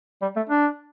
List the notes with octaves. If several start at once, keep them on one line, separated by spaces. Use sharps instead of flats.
G3
A3
D4